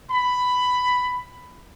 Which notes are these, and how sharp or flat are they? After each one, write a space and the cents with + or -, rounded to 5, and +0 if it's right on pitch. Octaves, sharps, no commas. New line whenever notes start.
B5 +10